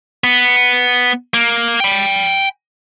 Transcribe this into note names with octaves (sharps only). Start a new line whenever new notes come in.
B3
A#3
G5 B5